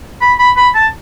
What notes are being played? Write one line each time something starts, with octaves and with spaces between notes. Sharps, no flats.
B5
B5
B5
A5